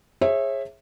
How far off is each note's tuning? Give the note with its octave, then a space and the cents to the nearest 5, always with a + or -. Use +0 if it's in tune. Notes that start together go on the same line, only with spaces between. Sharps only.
G#4 +0 C#5 -35 E5 +0